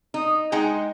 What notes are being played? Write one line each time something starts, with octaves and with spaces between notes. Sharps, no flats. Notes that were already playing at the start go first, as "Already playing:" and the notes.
D#4
G#3 D#4 F#5 G5